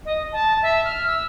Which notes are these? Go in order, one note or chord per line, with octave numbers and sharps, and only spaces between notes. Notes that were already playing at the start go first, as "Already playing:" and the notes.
D#5
A5
E5
F6
E6